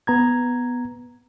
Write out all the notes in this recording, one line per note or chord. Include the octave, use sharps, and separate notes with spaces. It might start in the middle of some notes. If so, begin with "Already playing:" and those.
B3 A#5 G#6